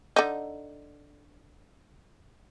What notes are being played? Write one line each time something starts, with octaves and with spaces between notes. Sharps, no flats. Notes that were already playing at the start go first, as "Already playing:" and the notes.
D3 D#4